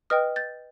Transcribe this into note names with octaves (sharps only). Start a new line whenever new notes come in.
B4 D#5 G5 D#6 F6
G6 A6